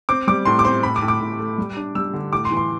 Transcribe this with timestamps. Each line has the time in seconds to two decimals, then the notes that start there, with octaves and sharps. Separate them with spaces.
0.09 C4 D6
0.27 G3 D6
0.45 A2 C6
0.59 D6
0.65 C4 C6
0.83 A2 B5
0.96 D6
1.02 A2
1.08 D6
1.21 A2
1.39 A3
1.58 G3
1.77 D4
1.95 G3 E6
2.14 D3
2.32 A2 D6
2.45 C6
2.51 E3
2.57 C6